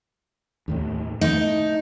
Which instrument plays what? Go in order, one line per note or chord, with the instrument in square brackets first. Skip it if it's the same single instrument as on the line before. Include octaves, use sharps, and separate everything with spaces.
[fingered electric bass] D#2 A2 D#3
[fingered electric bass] A3 [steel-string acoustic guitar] D#4